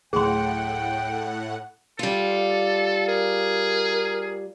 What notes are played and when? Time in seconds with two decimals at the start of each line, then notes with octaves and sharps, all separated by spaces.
0.13 D1 D2 A2 G#4 F#5 G5 C6
1.99 G3 F4 A4
3.08 G#4 A#4